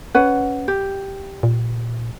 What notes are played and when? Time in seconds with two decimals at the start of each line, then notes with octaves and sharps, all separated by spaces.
0.14 C#4 B4 F#5
0.68 G4
1.43 A#2